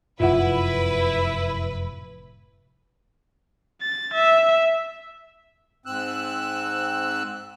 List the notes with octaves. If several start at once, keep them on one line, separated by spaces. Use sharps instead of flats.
F1 F#2 A2 E4 F4 B4 E5 F#5
A6
E5
G#2 C4 E6 F#6